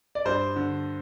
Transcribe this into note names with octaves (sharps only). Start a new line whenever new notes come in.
D5
G2 C5
D3